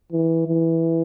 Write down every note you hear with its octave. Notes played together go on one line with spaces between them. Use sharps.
E3
E3